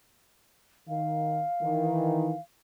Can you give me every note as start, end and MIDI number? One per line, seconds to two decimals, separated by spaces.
0.88 1.42 51
0.88 2.40 77
1.62 2.33 51
1.62 2.33 52